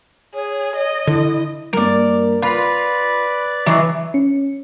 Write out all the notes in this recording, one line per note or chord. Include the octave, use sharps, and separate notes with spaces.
G#4 C#5
D#5
D3 E4
G2 A#3 A#4 D5
F4 B4 D5 B5
E3 F#3 G#3 D#5 D6
C#4